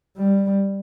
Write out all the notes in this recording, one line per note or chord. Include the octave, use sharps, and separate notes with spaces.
G3